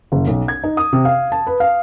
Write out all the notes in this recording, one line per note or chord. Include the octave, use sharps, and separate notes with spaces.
F#1
B1
G#6
D#4
D#6
C3
F5
A5
B4
F5